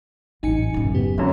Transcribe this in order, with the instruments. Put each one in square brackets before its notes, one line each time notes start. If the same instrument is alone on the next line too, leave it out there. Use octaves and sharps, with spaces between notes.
[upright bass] A1 F#2 [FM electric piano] D#4 G#5 C#7
[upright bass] F#2 C#3
[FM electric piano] B3 G4
[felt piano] F1 F#2 [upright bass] D3